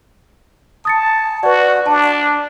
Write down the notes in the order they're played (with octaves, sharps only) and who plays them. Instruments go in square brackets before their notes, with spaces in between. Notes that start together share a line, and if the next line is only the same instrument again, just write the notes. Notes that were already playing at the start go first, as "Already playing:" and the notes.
[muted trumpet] A5 [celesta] D#6 A6 C#7
[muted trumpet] F#4 [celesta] B4 D5
[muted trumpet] D4 [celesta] A5